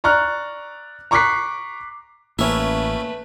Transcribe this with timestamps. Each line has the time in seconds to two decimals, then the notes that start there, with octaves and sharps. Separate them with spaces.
0.04 D5 A#5 C#6 F6 F#6
1.11 A#5 C#6 D6 F#6 B6 C7
2.39 A1 A3 A#3 C#4 E4 B4